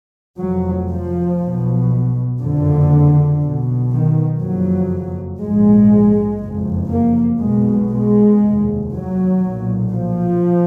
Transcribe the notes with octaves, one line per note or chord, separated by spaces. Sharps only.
F1 F2 F#3
F3
B1
B2
F#1 F2 D3
B1 B2
D#3
F#1 F2 F#3
A#1 G#2 G#3
F#1 F2
A#3
B1 B2 G#3
G#3
F1 D#2
F#3
B1 A#2
F3